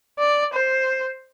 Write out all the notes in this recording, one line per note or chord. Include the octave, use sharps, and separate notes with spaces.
D5
C5